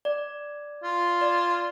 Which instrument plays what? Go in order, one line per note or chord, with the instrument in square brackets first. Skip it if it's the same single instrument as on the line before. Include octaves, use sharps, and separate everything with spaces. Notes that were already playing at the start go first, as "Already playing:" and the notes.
[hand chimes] D5
[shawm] F4
[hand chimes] D5